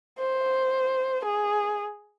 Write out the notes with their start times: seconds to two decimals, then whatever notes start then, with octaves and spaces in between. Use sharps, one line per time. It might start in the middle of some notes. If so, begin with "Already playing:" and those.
0.19 C5
1.25 G#4